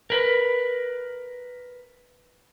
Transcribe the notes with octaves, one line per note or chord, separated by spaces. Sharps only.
A#4 B4